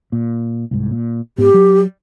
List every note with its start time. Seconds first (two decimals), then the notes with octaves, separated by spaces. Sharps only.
0.12 A#2
0.71 C2 G#2
0.91 A#2
1.38 G#2 B3 G4
1.54 F#3